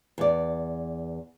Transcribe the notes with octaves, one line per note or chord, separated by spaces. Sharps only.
E2 D5